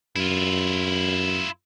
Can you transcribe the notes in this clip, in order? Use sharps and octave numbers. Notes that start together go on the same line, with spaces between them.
F#2 E4 F4